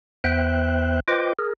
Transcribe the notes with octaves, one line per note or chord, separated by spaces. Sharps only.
E2 B3 C5 E5 G5 F#6
F4 B4 C5 D#5 G5 D6
G#4 A#4